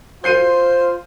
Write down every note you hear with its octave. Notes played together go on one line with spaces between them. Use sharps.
F4 C5 G6 C7 D#7